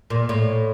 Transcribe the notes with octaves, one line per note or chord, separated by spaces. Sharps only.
A#2
A2